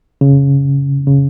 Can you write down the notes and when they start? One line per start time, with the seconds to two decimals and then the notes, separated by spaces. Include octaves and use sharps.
0.21 C#3
1.07 C#3